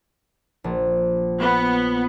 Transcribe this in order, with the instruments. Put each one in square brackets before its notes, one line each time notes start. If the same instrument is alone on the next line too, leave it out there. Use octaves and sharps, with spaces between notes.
[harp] A#1
[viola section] B3